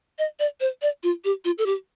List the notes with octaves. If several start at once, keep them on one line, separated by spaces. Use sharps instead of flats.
D#5
D5
C5
D5
F4
G4
F4
A4
G4